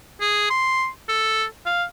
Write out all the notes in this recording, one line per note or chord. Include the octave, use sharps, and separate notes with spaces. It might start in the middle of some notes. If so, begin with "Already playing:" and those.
G#4
C6
A4
F5